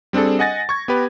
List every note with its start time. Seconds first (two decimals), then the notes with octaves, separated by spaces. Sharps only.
0.13 G3 C4 D4 G#4 A4
0.39 D#5 F#5 G#5 A6 A#6
0.69 C#6 G#6
0.88 B3 G4 B4